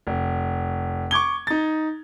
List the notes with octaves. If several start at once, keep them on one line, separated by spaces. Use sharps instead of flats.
F1
C#6 D6 G#6 G7
D#4 A6